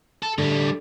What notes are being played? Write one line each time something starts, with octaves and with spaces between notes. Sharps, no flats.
A4
A2 D3 G3